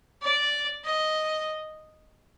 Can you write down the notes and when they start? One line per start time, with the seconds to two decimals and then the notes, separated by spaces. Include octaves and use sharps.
0.22 D5
0.84 D#5